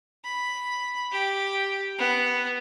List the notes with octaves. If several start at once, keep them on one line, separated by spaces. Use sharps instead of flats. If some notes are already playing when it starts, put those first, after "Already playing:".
B5
G4
B3